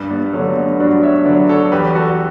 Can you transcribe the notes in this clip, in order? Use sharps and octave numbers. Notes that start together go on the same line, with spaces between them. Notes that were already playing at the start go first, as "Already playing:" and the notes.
Already playing: G2
G3 B3
D3 F#3 A3 C#4
B3 D4
G2 D4 F#4
C#5 E5
D3 F#3 B4 D5
A4 C#5
E2 G4 B4
F#4 A4